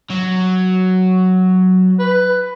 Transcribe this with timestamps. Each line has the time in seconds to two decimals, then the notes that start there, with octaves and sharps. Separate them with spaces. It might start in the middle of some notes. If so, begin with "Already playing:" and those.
0.10 F#3
1.99 B4